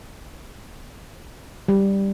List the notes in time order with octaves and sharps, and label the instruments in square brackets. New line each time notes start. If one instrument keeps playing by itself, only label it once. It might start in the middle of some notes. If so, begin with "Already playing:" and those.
[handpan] G3